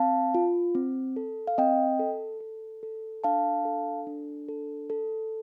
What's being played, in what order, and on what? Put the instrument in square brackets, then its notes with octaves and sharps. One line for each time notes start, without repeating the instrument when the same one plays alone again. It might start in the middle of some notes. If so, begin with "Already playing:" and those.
Already playing: [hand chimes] C4 F5 A5
F4
C4
A4
F5
C4 D#5 G5
A4
A4
A4
D4 F5 A5
A4
D4
A4
A4